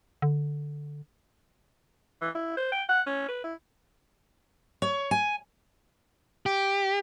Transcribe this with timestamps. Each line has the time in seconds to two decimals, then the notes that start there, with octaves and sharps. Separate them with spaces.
0.22 D3
2.21 E3
2.35 E4
2.57 C5
2.72 G5
2.89 F#5
3.07 C#4
3.28 B4
3.44 E4
4.82 C#5
5.11 G#5
6.46 G4